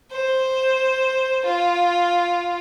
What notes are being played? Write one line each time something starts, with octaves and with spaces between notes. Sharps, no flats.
C5
F4